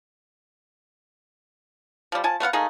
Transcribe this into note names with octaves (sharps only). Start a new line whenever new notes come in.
F3 G3
F3 G#5 A5
A3 B3 F5 F#5
A3 A#3 D#4 G#4